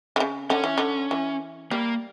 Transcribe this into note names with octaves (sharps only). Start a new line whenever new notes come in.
D3
C#3
D3 C#4
E3
D3
E3
G3 A#3